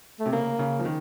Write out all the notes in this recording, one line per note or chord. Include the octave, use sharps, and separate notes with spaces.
A3
C3
C#3 A#3
C#3
F3
D#3